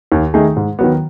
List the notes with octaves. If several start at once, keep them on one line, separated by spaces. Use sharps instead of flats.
D#2
D#3 A3 D#4 G#4
G#2
D#3 F#3 B3